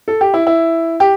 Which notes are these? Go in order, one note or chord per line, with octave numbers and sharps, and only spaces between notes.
A4
G4
E4
E4
G4